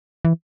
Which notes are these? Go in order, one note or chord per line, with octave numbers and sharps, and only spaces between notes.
E3